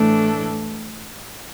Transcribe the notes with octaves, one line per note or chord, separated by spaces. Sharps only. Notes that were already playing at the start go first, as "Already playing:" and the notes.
Already playing: A2 E3 A3 D4 A4